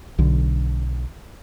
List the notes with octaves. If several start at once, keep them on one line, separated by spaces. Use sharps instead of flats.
B1 D3